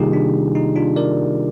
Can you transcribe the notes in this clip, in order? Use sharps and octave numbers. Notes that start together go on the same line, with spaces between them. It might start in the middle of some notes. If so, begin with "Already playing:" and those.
Already playing: C3 D#3 G3 A#3 D#4 F4 G4 G#4
D4
D#4
D4 F4
A#4 D5